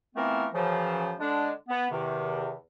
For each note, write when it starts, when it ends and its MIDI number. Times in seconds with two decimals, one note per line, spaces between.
0.16 0.46 52
0.16 0.46 53
0.16 0.46 57
0.16 0.46 59
0.16 0.46 60
0.16 0.46 70
0.54 1.14 42
0.54 1.14 49
0.54 1.14 52
0.54 1.14 53
1.20 1.50 50
1.20 1.50 56
1.20 1.50 62
1.69 1.86 59
1.91 2.53 40
1.91 2.53 48
1.91 2.53 51